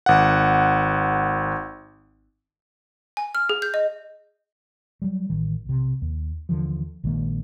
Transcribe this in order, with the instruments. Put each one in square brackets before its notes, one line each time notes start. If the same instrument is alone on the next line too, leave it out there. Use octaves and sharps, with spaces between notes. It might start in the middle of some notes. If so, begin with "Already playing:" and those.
[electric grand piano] G#1 F#5
[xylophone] G#5
F6
G#4
G6
D#5
[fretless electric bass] F#3 G3
A1 D#3
B1 C3
D#2
D#2 D3 E3 F3
A#1 D#3 G#3 A#3